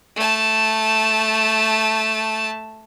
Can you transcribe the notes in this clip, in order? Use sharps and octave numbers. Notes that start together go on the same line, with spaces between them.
A3 A5